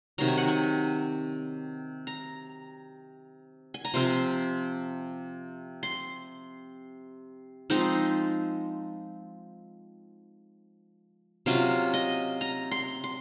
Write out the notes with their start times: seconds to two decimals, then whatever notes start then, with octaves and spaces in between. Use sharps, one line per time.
0.18 C3 D#3 F#3 A#5
0.28 G#5
0.38 F#5
0.48 G#5
2.07 A#5
3.74 G#5
3.85 A#5
3.94 C3 F3 C4 C6
5.83 C6
7.70 F3 G#3 C4 D#4 A#5
11.46 C3 F#3 C#4 F4 F5
11.94 D#5
12.41 A#5
12.71 C6
13.04 C6